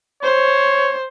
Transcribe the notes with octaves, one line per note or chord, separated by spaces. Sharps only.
C5 C#5